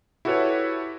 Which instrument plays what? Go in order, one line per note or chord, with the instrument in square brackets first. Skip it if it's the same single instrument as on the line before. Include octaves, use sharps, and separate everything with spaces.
[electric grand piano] E4 F#4 G4 A4 B4 C#5